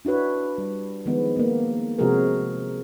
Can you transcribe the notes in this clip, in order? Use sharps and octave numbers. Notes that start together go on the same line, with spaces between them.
D4 E4 F#4 B4 C#5
G3
D#3 F3 G#3 B3
A#3 B3
C3 F3 G#3 F#4 G#4 A#4